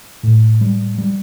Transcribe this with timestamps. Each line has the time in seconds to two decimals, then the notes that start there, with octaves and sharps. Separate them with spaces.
0.23 A2
0.61 G3
0.98 G3